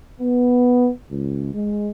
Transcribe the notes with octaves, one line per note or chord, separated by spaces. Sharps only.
B3
C#2
G#3